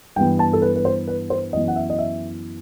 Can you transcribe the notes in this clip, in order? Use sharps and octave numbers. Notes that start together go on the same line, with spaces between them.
G2 E3 B3 G5
A5
A4
B4
B4
C5
B4
C5
F#2 E3 B3 D#5
F#5
E5
D#5
E5